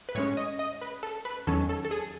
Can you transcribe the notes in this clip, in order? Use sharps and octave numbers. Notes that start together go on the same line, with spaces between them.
B4
A2 G#3 C#4 C#5
D#5
D#5
B4
A4
B4
E2 D#3 F#3 C#4 A4
A4
A4
G#4